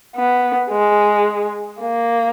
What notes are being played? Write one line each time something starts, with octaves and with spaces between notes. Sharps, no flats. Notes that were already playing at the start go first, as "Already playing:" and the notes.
B3
G#3
A#3